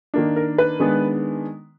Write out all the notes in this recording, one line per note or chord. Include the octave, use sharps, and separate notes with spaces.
D#3 A#3 D4
A#4
B4
D#3 G#3 B3 D4